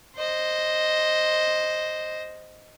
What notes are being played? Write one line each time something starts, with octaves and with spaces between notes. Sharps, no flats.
C5 D#5